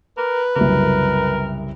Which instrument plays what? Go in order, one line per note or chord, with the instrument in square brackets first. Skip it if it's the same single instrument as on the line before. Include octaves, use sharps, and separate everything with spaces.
[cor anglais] A#4 [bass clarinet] B4
[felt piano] C2 F#2 C#3 [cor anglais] A#4